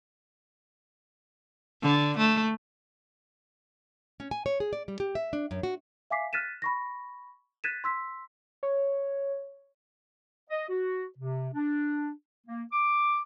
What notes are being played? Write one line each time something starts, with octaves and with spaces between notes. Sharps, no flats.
D3
A3
C#4
G#5
C#5
G#4
D5
G3
G4
E5
D4
F#2
F#4
E5 F5 G#5 D6 B6 C7
F6 F#6 A6 B6 D#7 E7
B5 C#6 A#6
F#6 G#6 A6 B6 D#7 E7
C6 E6 B6
C#5
D#5
F#4
C3
D4
A#3
D6